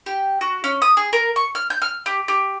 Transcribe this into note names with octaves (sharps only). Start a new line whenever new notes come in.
G4
F#4
C#4
D#6
G#4
A#4
C#6
F6
G6
F6
G4
G4